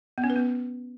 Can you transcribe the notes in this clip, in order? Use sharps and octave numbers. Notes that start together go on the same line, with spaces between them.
B3
C#4
B4
B3